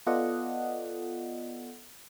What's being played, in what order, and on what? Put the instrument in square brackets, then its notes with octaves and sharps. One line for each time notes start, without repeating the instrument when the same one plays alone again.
[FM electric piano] B3 F4 A4 D5 D#5 F#5